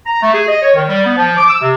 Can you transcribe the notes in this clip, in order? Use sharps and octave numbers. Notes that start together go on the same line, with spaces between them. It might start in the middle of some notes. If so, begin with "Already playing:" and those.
A#5
A3
G#4
D#5
C#5
D#3
G3
B3
F3
D6
E6
C3